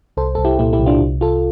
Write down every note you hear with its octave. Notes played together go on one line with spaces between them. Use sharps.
C2 A4 C5
C2 A4
E4 G4
A#2 E4 G4
E4 G4
C2
D4 F4
C2
C2 F4 A4